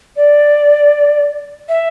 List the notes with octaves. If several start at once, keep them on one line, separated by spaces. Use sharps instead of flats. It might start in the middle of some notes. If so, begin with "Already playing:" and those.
D5
E5